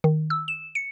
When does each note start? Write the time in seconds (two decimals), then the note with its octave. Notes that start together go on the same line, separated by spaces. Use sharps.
0.04 D#3
0.30 E6
0.48 E7
0.75 C#7